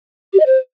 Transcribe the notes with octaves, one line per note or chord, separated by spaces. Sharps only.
G4
D#5
C5